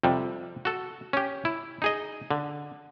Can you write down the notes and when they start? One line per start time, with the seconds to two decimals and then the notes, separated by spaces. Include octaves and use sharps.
0.03 F2 C3 G3
0.65 F#4 A4
1.13 C#4 G4
1.45 E4
1.82 D#4 G#4 D#5
2.31 D3